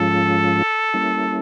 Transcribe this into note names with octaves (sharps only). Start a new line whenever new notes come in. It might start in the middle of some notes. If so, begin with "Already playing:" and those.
Already playing: G#2 F3 G#3 C#4 F4 A4
G3 A#3 C#4 E4